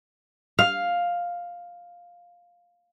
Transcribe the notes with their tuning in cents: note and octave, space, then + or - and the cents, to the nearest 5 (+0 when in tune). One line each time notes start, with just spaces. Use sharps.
F5 +5